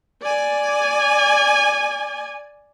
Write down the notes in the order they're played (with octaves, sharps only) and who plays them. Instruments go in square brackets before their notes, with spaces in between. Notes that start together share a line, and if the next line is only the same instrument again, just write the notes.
[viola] D5 G#5